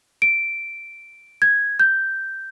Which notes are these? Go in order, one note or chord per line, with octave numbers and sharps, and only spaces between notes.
D7
G#6
G6